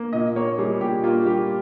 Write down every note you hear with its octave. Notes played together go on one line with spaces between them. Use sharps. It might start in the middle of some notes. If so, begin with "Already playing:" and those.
Already playing: A#3
A#2 D#5
A#3 C#5
G3 G#4
A#2 G4
A#3 F4
G3 G4